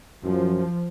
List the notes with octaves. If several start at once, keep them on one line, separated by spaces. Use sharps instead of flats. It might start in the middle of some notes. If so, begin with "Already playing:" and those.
F#2 F3